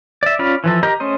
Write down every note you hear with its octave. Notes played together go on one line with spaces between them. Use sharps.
D5 E5
C#4 F4 D5 F5 B5
E3 F3 A4
G4 A#4 D#5 A#5 G6
A3 C#4 C5 D#5